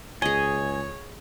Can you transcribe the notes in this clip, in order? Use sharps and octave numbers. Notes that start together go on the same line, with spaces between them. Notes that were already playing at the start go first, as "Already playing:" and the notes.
C#2 G#4 C#5 D#5 G#5